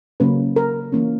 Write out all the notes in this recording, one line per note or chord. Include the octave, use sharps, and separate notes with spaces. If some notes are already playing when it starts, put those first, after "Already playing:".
C#3 F#3 A#3 C#4 B4
A#4
E3 A#3 C#4